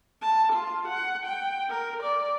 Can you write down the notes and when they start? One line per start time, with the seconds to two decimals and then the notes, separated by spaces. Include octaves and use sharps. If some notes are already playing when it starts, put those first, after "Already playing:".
0.22 A5
0.53 F4
0.88 F#5
1.26 G5
1.70 A#4
2.03 D5